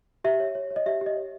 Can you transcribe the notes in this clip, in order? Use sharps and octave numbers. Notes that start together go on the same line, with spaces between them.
G4 E5
C#5
C#5
C#5
D#5
G4 E5
G4
D#5
C#5